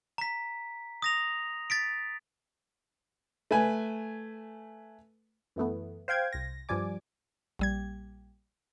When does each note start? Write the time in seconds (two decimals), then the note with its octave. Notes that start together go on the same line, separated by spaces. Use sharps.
0.18 A#5 B6
1.02 D#6 A#6 F7
1.70 A6 B6 D7
3.51 A3 B4 G#5
5.56 F#2 E3 A3 B3
6.08 C5 F5 G5 G#6
6.33 C2 A#6
6.69 G2 F3 G3 D5 G#5 D6
7.59 A#1 G3 G#6